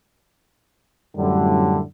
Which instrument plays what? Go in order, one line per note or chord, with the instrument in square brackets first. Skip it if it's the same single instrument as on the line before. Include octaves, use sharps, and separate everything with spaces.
[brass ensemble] F#2 A2 D3 G3